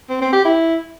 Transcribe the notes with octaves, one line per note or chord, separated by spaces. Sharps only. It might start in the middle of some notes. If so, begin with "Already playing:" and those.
C4
C4
G4
E4